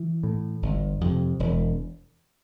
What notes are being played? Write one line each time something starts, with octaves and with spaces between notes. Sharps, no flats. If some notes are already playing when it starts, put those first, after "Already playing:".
Already playing: E3
A2
G1
F2 C3
E1